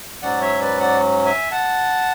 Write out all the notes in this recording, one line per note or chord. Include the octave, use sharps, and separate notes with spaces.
G#2 F#3 C#4 D5 F#5
C#5 E5
B4 D5
D5 F#5
E5 G#5
F#5 A5